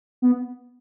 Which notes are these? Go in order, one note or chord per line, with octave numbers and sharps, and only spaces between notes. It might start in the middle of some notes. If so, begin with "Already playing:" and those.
B3